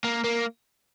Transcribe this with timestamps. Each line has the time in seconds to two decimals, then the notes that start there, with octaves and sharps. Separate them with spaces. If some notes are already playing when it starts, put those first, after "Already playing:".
0.04 A#3
0.24 A#3